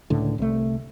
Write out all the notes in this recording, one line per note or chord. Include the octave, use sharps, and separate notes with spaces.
C#2 A2 D3
C2 A3